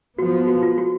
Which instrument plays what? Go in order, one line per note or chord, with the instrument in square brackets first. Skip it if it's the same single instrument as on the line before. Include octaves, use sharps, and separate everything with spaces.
[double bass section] F3 B3 [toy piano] F#4
[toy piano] F#4
F4
F#4